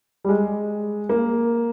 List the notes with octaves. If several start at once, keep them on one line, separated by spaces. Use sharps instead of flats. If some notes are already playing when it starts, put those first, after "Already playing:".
G3
G#3
A#3